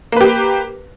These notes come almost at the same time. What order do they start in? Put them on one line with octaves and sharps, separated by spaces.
A#3 B4 G4